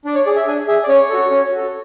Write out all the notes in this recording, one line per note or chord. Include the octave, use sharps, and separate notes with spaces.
D4 D5
C#5
G#4 D5
E5
D4 G#5
G#4 E5
D5
C#4 C#5
F#4 A4
C#4
F#4
A4